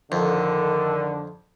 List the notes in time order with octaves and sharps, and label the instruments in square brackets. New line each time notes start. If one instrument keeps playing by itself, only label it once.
[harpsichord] F2 [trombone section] D3 [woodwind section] D#3